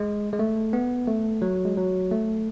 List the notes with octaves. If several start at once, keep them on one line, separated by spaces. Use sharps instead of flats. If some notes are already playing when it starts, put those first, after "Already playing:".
Already playing: G#3
G#3
A3
B3
A3
F#3
G#3
F#3
A3